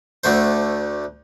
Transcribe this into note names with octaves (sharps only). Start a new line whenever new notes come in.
D2 D3 A3 C5